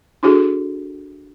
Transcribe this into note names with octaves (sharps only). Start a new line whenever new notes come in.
D4 E4 F#4 G#4 A4